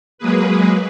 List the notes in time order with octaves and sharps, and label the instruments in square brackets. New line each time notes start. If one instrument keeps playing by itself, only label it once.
[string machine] F#3 G#3 A#3 G#4 B4